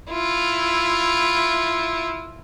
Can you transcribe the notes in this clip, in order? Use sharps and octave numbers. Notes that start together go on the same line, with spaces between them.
E4 F4